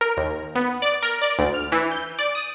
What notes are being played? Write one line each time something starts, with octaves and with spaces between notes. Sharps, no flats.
A#4
D#2
B3
D5
A#4
D5
D2
F6
E3
G6
D5
D#6